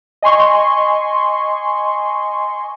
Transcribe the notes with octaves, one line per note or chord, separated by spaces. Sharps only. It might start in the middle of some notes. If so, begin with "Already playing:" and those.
D#5 G#5 C6 C#6